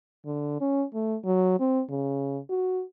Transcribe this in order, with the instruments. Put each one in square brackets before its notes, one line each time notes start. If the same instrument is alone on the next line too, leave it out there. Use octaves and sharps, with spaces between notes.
[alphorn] D3
C#4
A3
F#3
C4
C#3
F#4